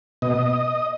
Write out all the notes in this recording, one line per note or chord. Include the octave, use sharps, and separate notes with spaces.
B2 D#5